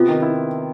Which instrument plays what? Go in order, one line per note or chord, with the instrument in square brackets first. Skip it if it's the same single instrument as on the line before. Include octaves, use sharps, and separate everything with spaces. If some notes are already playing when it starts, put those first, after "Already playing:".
Already playing: [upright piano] C3 B3 [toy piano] F4
[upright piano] D#3
E4